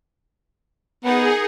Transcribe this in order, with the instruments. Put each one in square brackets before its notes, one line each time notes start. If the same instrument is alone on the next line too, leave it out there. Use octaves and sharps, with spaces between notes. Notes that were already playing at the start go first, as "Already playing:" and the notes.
[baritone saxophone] B3 [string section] D#4 A#4 F#5 [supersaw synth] G#4